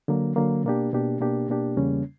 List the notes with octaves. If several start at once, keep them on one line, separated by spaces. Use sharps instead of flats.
D3 F#3 A#3
D3 F#3 A#3
B2 A#3 D4 G4
B2 A#3 D4 G4
B2 A#3 D4 G4
B2 A#3 D4 G4
E2 C#3 G3 A#3 C#4